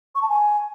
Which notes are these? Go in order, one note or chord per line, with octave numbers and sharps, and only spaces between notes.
C#6
A5
G#5